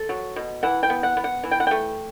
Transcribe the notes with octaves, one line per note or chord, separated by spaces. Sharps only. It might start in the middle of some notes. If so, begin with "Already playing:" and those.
Already playing: A4
F#3
B2
E3 F#5
G5
B3
F#5
B3
F#5
E3
G5
F#5
A3 G5